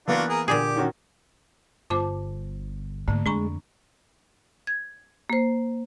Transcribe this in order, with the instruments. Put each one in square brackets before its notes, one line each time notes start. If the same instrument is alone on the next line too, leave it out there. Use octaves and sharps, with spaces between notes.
[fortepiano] E3 A#3 B3 [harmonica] D4 F4 F#4
[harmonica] G#4 A#4
[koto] A#2 D3 G#4 [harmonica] G4
[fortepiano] D#3 C#4 F#4
[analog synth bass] G1 [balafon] F4 D6 [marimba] C5 A5
[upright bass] E2 G#2 [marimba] D3 A3 A#3
[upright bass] F2 [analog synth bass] G#3 [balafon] D4 A#5 C#6
[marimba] G#6
A#3 C5